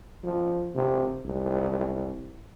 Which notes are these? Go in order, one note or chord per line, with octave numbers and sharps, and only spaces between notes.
F3
C3
C2